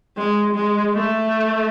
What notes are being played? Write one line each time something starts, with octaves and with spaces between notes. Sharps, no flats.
G#3
G#3
A3